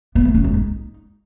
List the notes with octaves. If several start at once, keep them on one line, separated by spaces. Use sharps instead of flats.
B3
A3
C#4
G#3
D#4